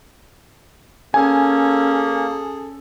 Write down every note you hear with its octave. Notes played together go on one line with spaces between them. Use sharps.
A#3 C#4 G#4 A4 G#5